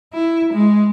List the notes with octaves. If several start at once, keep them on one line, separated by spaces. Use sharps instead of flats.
E4
G#3